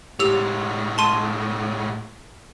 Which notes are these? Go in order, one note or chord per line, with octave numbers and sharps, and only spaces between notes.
A2 G#3 G4 E6 F7
A5 C6 D#7